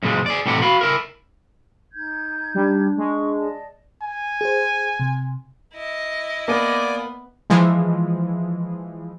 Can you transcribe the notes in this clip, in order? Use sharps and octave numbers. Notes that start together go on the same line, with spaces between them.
F#2 A#2 C#3 G#3
G#4 D5
A2 C3 E3 G4 F#5
F#4 F5 B5
E4 A#4
D#4 G6 G#6
G3 D4
G#3 C#6
D5 D#5 A5
G#5
G#4 C5
C3
E4 D#5
A#3 B3 D5 G#5 D6
E3 F3 G#3